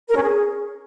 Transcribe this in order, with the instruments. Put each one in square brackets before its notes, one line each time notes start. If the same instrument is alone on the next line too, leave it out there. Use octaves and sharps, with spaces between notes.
[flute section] A#4
C#4
G#4